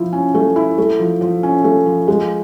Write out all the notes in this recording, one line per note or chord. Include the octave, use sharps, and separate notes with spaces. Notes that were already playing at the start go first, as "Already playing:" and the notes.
Already playing: F3 E4
C#4
A3
E4
A3
F3
F3
C#4
A3
F3
G#3